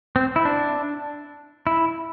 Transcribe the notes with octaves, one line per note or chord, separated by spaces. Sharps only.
C4
E4
D4
E4